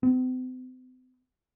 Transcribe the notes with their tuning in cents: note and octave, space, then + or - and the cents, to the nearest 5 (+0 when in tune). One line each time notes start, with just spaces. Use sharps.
C4 -45